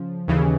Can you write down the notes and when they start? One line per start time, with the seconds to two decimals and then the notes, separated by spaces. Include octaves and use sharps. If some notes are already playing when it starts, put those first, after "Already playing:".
Already playing: C#3 F3
0.28 D#2 C#3 E3